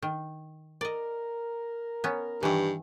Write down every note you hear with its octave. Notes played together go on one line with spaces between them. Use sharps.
D#3
A#4 D5 D#5
B3 C#4
G2 D#3 E3